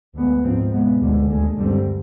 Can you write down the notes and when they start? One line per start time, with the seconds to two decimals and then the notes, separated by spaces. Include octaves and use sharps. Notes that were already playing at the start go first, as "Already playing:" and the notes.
0.14 D2 D3 G#3 B3
0.43 G#2 F3 C4
0.72 B2 G#3 B3
1.00 D2 D3 G#3
1.27 D#2 D3 G#3
1.57 G2 D3 G3 C4